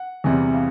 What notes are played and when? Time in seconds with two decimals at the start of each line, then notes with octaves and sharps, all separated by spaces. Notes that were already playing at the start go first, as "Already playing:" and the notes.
Already playing: F#5
0.24 E2 C3 E3 G3
0.54 F5